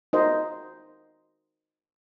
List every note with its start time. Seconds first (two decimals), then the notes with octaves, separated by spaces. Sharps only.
0.13 D#4 F#4 A#4 C5 D#5 E5